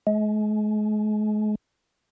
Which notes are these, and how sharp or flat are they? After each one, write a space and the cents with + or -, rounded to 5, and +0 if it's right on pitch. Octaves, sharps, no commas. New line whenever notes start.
G#3 +40